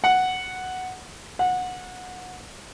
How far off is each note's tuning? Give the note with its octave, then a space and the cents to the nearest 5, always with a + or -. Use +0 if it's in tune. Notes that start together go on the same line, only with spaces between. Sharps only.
F#5 +0
F#5 -20